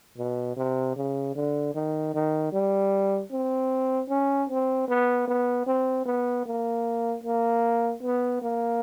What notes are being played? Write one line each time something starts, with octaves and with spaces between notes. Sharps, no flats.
B2
C3
C#3
D3
D#3
D#3
G3
C4
C#4
C4
B3
B3
C4
B3
A#3
A#3
B3
A#3